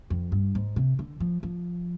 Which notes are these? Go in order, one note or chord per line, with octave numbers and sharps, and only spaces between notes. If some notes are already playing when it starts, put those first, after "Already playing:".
F2
G2
G#2
C3
D3
F3
F3